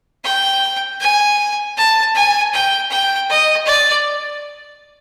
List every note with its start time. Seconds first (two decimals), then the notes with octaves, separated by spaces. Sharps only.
0.24 G5
1.00 G#5
1.77 A5
2.15 G#5
2.53 G5
2.90 G5
3.29 D#5
3.66 D5